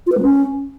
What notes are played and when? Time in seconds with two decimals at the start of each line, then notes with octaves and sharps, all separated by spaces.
0.07 F4
0.12 B4
0.17 G#3
0.23 C#4